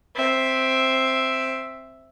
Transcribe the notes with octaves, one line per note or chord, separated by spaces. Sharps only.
C4 E5